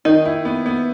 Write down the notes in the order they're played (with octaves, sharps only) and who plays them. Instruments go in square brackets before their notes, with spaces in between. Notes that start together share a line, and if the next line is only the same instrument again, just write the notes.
[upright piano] D#3 [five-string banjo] D#4
[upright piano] E4
B3
B3